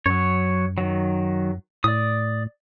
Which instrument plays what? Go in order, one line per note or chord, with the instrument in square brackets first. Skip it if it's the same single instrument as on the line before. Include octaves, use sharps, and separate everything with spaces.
[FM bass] F#2 [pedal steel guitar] F#3 C#5
[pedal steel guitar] D#3 F#3
[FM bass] A2 [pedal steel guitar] D5 D#6